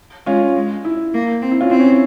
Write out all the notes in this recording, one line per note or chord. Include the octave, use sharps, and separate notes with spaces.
G#3 C#4 F4
G#3
E4
A#3
C4
E4
C#4 F4
C4 E4
C#4
E4